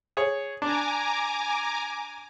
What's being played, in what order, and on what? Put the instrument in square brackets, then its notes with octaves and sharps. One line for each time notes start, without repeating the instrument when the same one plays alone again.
[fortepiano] G#4 C#5
[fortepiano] D4 [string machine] G#5 A#5 D6